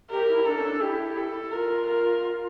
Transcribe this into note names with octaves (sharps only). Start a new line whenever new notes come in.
G4 A#4
E4
D4 A4
C#4
D4
E4 G4
A4
F4 A#4
A#4